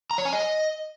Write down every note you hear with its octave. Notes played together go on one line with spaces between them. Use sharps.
A#5
C#5
G#5
D#5